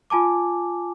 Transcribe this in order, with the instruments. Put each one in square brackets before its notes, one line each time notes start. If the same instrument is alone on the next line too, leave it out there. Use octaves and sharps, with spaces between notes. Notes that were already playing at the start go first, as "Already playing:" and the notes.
[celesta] F4 G#5 A5 D6